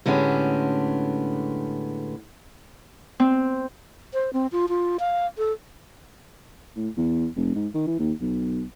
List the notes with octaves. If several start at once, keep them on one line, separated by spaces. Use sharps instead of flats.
A2 D3 G#3 B3 C#4 G4
C4
C5
C4
F4
F4
F5
A4
A2
E2
F1
G#2
D#3
E3
D#2
B1